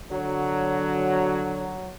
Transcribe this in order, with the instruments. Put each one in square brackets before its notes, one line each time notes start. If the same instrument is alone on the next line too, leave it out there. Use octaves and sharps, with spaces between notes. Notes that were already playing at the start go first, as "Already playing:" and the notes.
[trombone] D3 [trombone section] F#3